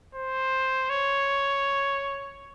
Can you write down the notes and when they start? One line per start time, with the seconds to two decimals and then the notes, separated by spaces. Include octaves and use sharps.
0.15 C5
0.89 C#5